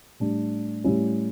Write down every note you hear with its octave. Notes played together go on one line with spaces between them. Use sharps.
A2 G3 D4
A2 G3 C#4 E4